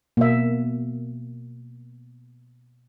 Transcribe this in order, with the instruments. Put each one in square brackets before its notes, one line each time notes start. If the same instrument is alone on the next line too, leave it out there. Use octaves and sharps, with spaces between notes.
[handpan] B2 [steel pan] A#3 E5